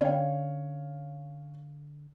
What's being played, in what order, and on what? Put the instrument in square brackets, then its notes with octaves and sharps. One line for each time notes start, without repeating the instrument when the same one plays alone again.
[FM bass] D3 [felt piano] C#4 C#5 F5 [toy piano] D5 G5